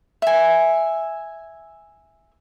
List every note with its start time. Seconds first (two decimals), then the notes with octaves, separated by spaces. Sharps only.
0.22 E5 G#5